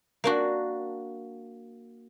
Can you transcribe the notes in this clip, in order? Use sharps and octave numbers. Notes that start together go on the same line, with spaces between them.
A#3 D4 F#4